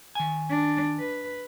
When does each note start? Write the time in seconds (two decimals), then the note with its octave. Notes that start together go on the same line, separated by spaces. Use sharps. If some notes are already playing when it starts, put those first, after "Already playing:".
0.15 D#3 G#5
0.50 D4
0.99 B4